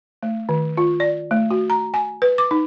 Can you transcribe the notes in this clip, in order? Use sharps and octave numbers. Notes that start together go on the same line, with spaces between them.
A3
D#3
F4
D5
A3
F#4
A#5
G#5
B4
D6
D#4